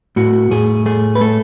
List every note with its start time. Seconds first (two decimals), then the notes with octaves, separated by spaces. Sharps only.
0.16 A2 F#4
0.51 A2 G#4
0.86 A3 G#4
1.15 B4
1.21 A3 A4